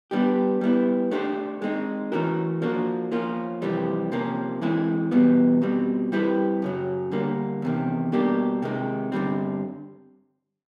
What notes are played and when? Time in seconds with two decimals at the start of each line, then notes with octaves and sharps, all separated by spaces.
0.11 G3 B3 D4 G4
0.61 G3 B3 E4
1.11 A3 D4 G4 C5
1.62 G#3 C4 D#4
2.12 E3 A3 C#4 F#4 A#4
2.62 F3 A#3 D4 F#4
3.12 F3 A#3 C#4 F4
3.62 F2 C3 E3 G3 C4
4.12 C3 F3 A#3 C#4
4.61 E3 G#3 C4 E4 G#4
5.11 E2 B2 G3 B3
5.62 B2 G3 C4
6.12 G3 C4 E4 G4 B4
6.62 F#2 C#3 F#3
7.12 D3 G3 A#3
7.62 E2 C3 D#3
8.12 B2 G3 A#3 D4 G4
8.62 C3 D#3 G#3
9.12 G2 D3 G3 C4